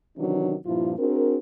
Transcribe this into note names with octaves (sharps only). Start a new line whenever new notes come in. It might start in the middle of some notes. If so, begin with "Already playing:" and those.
C3 D#3 E3 F#3 C#4 D4
G2 A#2 F3 A#3 E4 F4
C4 D4 F#4 G#4 A#4